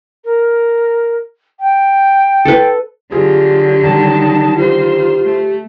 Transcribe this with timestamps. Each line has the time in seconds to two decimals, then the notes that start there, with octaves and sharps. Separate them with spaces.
0.25 A#4
1.60 G5
2.45 A4 B4
3.12 D3 F#3 F4 G4 G#4
3.83 D#3 G3 D#4 A5
4.57 F4 G4 C5
5.25 A3